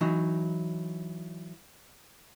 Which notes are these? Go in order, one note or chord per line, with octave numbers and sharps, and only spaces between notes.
E3 F#3 D#4